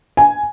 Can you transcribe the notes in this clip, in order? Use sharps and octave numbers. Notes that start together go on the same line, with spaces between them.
G#5